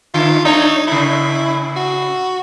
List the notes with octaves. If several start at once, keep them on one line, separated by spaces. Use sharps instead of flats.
D3 F4
A3 D4 D#4 C#5
A2 C#3 E4
F#4